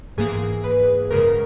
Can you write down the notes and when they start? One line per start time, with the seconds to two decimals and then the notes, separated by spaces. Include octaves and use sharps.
0.17 G#2 E3 A#3 G#4
0.64 B4
1.10 F#2 C#3 G#3 A#4